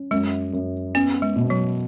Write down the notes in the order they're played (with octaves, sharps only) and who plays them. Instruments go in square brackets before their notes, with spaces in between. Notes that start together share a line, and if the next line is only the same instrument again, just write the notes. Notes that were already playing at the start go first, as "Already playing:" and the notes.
Already playing: [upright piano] C#4
[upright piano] F#2 [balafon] G#3
[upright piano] F#2
[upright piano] B3 [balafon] C#4
[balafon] G#3
[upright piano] B2
[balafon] F#3